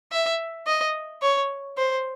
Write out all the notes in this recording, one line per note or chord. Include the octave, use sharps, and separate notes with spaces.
E5
D#5
C#5
C5